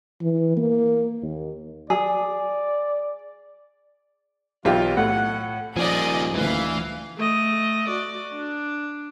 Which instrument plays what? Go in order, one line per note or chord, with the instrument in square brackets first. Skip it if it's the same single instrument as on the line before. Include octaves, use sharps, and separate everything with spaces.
[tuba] E3
A#3
D#2
[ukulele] G#4 [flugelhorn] D5
[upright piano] B1 G4 [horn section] E3 F4
[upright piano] A2 [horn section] F#5
[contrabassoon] D#1 [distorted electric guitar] A#2 G#4 [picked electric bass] F3 [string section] D5 D#5
[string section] D2 F5 [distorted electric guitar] E3
[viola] A3 D#5
F#4 D5
D4